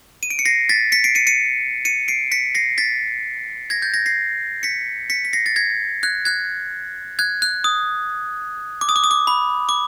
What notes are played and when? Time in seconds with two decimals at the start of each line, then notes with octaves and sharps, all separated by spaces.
0.23 D#7
0.30 D7
0.39 C#7
0.45 A#6 C7
0.69 A6 B6
0.92 B6 C#7
1.04 C7 D7
1.15 C#7 D#7
1.27 C#7 D#7
1.85 C#7 D#7
2.08 C7 D7
2.32 B6 C#7
2.55 A#6 C7
2.78 A6 B6
3.70 G#6 A#6
3.82 G6 A6
3.94 G#6 A#6
4.06 A#6 C7
4.63 B6 C#7
5.10 B6 C#7
5.25 B6
5.33 A#6 C7
5.46 A6
5.56 G#6 A#6
6.03 F#6 G#6
6.25 F#6 G#6
7.19 F#6 G#6
7.42 F#6
7.64 D#6
8.81 D6
8.89 D#6
8.96 D6
9.04 D#6
9.11 D6
9.27 B5
9.69 D6